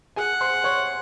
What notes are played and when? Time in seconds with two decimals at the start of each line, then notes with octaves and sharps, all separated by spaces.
0.16 G#4 F#5 G#5
0.41 C5 C6
0.64 C#5 C#6